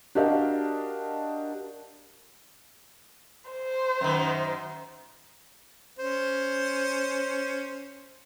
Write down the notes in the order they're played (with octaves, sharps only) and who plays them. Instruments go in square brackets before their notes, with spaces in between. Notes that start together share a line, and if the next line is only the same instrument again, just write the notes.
[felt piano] D4 F#4 G4 A#4 D#5 F5
[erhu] C5
[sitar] F#2 D#3
[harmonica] C#4 C5